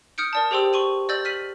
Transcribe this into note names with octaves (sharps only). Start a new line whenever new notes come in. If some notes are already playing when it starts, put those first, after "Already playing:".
D#6 F6 G6 C#7 D7
A#4 D5 A5
G4 G#4 C5 G5 C6 E6
C6 C#6 D#7 F#7
D5 D#5 E6 G6 A6 F#7
F6 B6 D#7 F#7